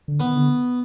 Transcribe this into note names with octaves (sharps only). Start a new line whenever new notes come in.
D3
D#3 B3
D3